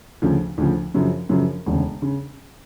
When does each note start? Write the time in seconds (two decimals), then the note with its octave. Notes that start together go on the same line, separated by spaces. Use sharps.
0.22 D2 C#3 F3
0.58 D2 C#3 F3
0.94 F#2 C#3 F3
1.29 F#2 C#3 F3
1.66 E1 D2 C#3
2.02 C#3